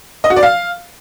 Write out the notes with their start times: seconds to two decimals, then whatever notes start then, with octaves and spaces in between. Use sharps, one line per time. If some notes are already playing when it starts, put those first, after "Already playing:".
0.24 D#5
0.30 F#4
0.36 D5
0.43 F5